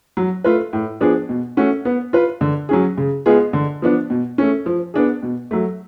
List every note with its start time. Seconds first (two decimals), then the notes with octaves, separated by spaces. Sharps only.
0.17 F#3
0.44 A3 F4 B4
0.73 A2
1.01 F3 B3 D4 G#4
1.29 B2
1.57 A3 C#4 F#4
1.85 B3
2.13 F4 B4
2.41 D3
2.69 F#3 C#4 G#4
2.97 C#3
3.26 G#3 B3 F4 G#4
3.53 D3
3.82 F3 B3 D4
4.10 B2
4.38 A3 C#4
4.66 F3
4.94 B3 D4 G#4
5.22 B2
5.51 F#3 A3